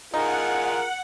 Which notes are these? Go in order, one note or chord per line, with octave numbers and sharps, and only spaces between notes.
D#4 F4 G#4 A#4 F#5